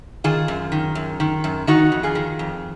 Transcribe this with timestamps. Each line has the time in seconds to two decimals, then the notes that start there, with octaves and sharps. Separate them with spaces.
0.24 D#3 F4 G#4
0.48 F#2
0.72 D#3
0.95 F#2
1.20 D#3
1.44 F#2
1.67 D#3 D#4 F#4
1.92 F2
2.03 F4 G#4
2.15 D#3
2.39 F2